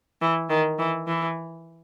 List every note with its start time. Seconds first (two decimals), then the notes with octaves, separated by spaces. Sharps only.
0.21 E3
0.50 D#3
0.79 E3
1.07 E3